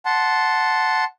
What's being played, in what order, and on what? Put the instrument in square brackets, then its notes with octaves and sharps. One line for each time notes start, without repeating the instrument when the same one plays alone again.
[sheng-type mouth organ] F#5 A5 C6